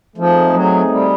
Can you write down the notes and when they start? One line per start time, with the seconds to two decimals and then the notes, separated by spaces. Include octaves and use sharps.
0.17 F3 A3 C4 D#4 G#4
0.53 F#3
0.86 F#3
0.90 G3